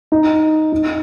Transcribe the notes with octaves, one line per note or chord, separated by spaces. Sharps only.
D#4
D#4